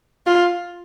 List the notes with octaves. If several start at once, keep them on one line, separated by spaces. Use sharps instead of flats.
F4